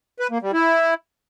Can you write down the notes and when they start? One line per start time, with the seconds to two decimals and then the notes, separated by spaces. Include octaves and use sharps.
0.20 B4
0.31 A#3
0.42 G3
0.53 E4